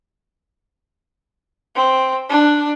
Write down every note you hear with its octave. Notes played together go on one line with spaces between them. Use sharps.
C4
D4